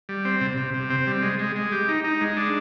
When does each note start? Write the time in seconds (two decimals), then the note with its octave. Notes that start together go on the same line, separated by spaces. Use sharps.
0.09 G3
0.25 C4
0.41 C3
0.58 C3
0.74 C3
0.90 C4
1.07 G3
1.22 G#3
1.39 G#3
1.56 G#3
1.72 G4
1.88 D#4
2.04 D#4
2.21 G#3
2.37 D4